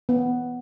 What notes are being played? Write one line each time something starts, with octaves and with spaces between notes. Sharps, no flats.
B3